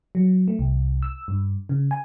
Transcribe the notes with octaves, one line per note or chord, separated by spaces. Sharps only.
F#3
A3
C2
E6
G2
C#3
G#5